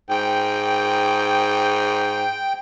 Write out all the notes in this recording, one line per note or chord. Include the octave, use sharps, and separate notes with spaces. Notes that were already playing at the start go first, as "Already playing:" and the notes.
G#2 G5